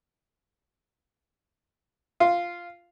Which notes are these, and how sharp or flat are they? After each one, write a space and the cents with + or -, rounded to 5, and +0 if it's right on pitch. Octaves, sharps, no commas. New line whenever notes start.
F4 -5